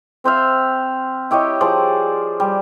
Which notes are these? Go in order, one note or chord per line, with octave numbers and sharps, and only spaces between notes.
C4 C5 E5 F5
E4 G4 C#5 D#5
F3 G#4 C5 D5
G3